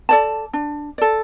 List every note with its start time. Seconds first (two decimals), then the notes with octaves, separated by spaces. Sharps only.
0.09 A4 D5 A5
0.53 D4
0.98 A4 D5